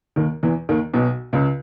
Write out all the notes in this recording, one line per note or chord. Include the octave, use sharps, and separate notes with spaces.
D#2 D#3
E2 E3
D#2 D#3
B1 B2
C#2 C#3